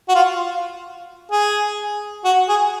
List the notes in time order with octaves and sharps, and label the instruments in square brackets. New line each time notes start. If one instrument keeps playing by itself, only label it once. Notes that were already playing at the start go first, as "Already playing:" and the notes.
[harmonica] F#4
F4
G#4
F#4
G#4